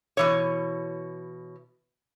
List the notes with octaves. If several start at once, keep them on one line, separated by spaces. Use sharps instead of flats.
B2 E3 C#5